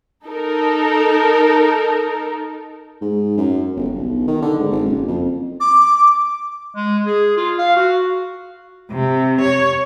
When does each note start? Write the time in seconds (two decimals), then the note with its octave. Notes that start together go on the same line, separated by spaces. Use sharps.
0.24 D#4 A4 A#4
3.01 G#2
3.37 F#2
3.76 G1
3.95 B1
4.27 D#3
4.42 D3
4.59 G#2
4.71 G#1
4.85 F#1
5.08 F2
5.60 D6
6.75 G#3
7.06 G#4
7.37 F4
7.59 F5
7.76 F#4
8.92 C3
9.41 C#5